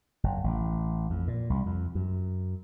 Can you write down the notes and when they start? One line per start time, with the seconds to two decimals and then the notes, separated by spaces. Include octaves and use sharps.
0.23 F#1
0.44 A1
1.10 F2
1.28 A#2
1.50 C2
1.66 F2
1.95 F#2